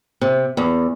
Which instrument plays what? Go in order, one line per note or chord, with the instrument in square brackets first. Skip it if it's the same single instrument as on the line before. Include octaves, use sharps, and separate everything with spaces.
[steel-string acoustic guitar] C3
E2